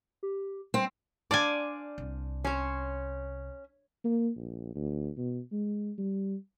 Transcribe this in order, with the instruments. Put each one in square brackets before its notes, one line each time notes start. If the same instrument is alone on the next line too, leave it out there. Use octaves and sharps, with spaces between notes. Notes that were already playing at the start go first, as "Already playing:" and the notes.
[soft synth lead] G4
[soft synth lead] G3 [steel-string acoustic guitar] C4
[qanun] D4 C5 F5 [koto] D5 G#5
[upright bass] C2
[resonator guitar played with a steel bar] C#4 [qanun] C5 C#5
[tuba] A#3
A#1
D2
B2
G#3
G3